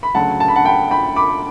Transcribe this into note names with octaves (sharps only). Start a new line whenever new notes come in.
B5
D2 C#3 F#3 F#5 A5
A5
B5
F#5 A5
G5 B5
G5 B5
B5 D6